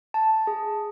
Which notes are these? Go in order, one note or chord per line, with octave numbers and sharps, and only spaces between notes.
A5
G#4